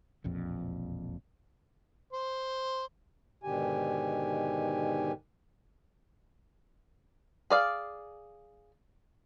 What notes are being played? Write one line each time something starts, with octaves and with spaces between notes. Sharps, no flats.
E1 A#1 F2
C5
G#2 B2 D3 D#3 G4 G#5
G#4 D5 F5